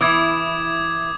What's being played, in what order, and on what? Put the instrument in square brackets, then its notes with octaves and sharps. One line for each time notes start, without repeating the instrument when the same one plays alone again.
[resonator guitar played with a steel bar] E3 E4 [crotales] D6 D#6 G#6